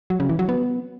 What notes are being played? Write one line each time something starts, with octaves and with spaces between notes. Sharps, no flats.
F#3
C#3
E3
F#3
B3